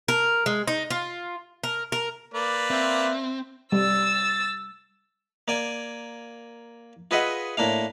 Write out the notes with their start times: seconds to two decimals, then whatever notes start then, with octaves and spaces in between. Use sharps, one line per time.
0.08 A#4
0.46 G#3
0.67 D#4
0.90 F4
1.63 A#4
1.92 A#4
2.34 A#3 B4 D5
2.71 C4 E5
3.72 G3 E6 A6
5.48 A#3 D5 G#5
7.11 F4 G#4 B4 D#5 E5 F#5
7.57 A2 A#3 D4 F5